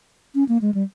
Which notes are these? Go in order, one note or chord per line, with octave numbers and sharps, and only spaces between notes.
C#4
A#3
G#3
G3